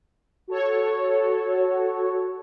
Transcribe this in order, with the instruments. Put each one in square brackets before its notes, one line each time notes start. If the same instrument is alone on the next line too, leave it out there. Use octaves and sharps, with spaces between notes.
[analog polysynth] F#4 A4 C#5